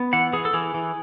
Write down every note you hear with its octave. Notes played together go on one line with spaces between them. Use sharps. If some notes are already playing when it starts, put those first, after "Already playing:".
Already playing: B3
E3 F#5
E3 G#4
A4
E3 G#4
E3